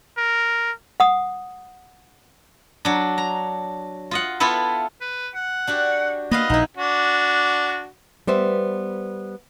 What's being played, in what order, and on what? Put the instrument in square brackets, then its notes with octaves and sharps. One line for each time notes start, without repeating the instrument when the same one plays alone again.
[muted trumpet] A#4
[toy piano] F#5 D#6
[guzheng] F#3 D4
A#5
F4 D#5 F#5
B3 E4 F4 A4 B4
[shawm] B4
F#5
[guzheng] D4 F#4 G4
[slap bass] A#3 [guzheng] B3 B4 F5 [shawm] D#5
[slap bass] A#1 [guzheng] B3 E4 [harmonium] D#4
[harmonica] D4 F#4
[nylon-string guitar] G3 B3 C5 E5